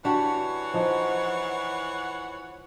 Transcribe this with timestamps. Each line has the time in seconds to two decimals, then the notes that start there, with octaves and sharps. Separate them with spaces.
0.05 E3 D4 F#4 G4 C#5 F#5
0.74 F3 D#4